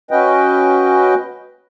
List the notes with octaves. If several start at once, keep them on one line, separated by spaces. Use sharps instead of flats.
C#4 F#4 B4 D#5 G5